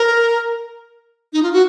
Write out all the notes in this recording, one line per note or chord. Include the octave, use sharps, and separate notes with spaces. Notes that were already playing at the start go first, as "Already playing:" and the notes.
Already playing: A#4
D#4
F4
F#4